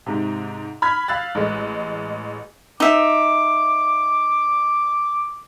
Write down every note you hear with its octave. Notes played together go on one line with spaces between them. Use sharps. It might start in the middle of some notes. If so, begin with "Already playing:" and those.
G#2 C3
B5 F6 G#6 B6
F5 E6 F#6 A6
A1 G#3
D#4 E5 D6